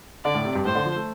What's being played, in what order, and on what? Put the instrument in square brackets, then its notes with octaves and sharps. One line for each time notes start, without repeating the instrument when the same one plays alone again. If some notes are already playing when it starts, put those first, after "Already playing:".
[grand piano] D3 [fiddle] D5
[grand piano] A2
C3
G2
[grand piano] A2 [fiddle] C5
[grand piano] D3
F3
A3